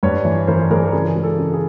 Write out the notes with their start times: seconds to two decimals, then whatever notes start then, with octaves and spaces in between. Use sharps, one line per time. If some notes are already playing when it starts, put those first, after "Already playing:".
0.03 G2 B4 C#5
0.25 E3
0.47 E3 A#4 C5
0.70 E3 G#4 A#4
0.93 C#3 G#4 A#4
1.16 G#3
1.23 A4
1.39 C#3
1.53 G#4